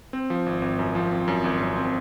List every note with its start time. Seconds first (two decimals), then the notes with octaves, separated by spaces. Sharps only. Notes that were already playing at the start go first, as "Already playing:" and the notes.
0.13 C4
0.30 F3
0.46 G#1
0.62 G#1
0.79 F#2
0.95 F3
1.12 C4
1.28 F#2
1.44 G#1
1.61 F#2
1.76 C4